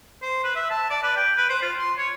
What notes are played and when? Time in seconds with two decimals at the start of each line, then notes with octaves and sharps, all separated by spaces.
0.22 C5
0.44 B4
0.56 E5
0.70 A5
0.90 D5
1.03 B4
1.17 G5
1.38 B4
1.50 C5
1.62 F4
1.78 C6
1.98 C#5